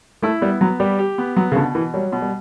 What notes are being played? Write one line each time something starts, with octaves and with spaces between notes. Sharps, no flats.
A3 E4
G3 B3
F#3 B3
G3 G4
G4
B3
F#3 B3
C#3
B2 D3
B2 E3
F#3 G3
B2
G3